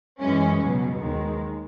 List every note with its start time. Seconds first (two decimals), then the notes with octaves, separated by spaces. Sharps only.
0.20 F#2 E3 G#3 C#4
0.60 C#2 B2 F#3
1.01 D#2 D#3 G#3